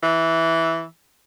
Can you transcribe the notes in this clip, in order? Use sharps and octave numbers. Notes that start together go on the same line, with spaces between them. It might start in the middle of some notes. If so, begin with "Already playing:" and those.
E3